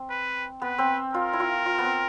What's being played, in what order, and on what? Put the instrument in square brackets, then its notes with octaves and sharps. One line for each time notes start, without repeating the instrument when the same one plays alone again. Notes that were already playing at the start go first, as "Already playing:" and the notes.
Already playing: [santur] C4
[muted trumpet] B4
[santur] B3 [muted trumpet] B4
[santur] C4
[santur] F4 [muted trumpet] A#4
[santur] E4
F4
F4
B3
C4